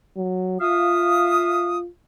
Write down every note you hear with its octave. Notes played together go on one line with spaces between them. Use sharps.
F#3
F4 E5 F5 D#6